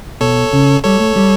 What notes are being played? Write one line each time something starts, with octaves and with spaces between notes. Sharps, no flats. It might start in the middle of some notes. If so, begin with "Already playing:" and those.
B2 A4 C#5
C#3
G3 A4 C#5
A3
G3